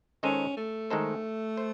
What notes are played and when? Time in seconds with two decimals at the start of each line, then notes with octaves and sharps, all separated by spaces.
0.23 D#3 G#3 C#4 D#4 A4 C5
0.57 A3
0.90 D#3 G#3 D#4 A4 C5
1.57 C5